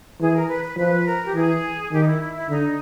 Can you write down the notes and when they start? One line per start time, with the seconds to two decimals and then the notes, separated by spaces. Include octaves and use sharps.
0.20 E3 G#4
0.34 A#4
0.48 B4
0.63 B4
0.77 F3 B4
1.05 A#4
1.25 G4
1.34 E3 G#4
1.92 D#3 G4
2.01 D#4
2.06 E4
2.21 E4
2.35 E4
2.49 D3 D#4